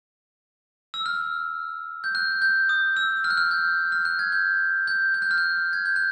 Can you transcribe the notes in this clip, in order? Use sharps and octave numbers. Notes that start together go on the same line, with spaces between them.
E6
F6
G6
F#6
G6
D#6
E6
F6
F#6
F6
G6
F6
F#6
G#6
G6
G6
G6
F#6
F6
F#6
G#6
G6
F#6